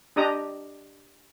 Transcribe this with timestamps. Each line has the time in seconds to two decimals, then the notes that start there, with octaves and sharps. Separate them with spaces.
0.16 D4 G4 D#5 A#5 D#6